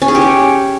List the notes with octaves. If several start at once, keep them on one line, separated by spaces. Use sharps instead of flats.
C#4
G#4
G4
C#5